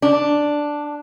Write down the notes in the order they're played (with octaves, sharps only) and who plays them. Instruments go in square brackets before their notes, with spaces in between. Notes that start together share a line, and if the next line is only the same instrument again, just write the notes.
[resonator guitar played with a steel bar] D4